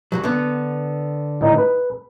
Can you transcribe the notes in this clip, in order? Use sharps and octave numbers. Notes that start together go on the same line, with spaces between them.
C2 F#2 F#3
D3 B3
A2 D#3 D#4
B4